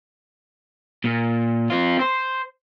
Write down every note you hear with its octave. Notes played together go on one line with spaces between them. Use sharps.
A#2
C4 F4
C5